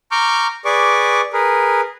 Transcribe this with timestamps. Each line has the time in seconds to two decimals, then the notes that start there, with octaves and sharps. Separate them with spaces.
0.11 A#5 C#6 D6 F6 G6
0.65 G#4 B4 D5 C#6 D6
1.33 G#4 A#4 B4